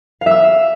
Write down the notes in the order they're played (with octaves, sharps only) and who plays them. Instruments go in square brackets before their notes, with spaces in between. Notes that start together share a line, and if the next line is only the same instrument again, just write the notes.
[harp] F5
E5
E6